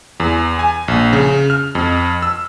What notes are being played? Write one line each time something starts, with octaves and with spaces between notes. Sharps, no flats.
E2
G#5
A#1
C#3
F6
F2
E6